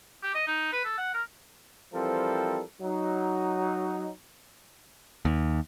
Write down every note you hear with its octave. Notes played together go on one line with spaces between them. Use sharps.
G4
D#5
D#4
B4
A4
F#5
A#4
E3 F3 G3 C4 A4 A#4
F#3 D#4
D#2